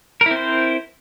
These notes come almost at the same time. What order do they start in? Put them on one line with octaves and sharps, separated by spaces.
A#4 E4 C4 C5